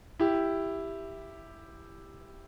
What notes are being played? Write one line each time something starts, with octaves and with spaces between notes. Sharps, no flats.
E4 G4